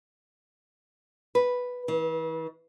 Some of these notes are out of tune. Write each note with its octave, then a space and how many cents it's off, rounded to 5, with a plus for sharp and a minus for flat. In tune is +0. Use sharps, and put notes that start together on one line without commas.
B4 +0
E3 -35